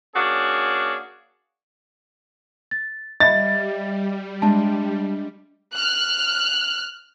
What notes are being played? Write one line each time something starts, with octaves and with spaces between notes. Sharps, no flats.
A#3 C#4 D4 F#4 G#4
A6
G3 D#5 E5 B5 A6
G#3 D4 E5 A5
F6 F#6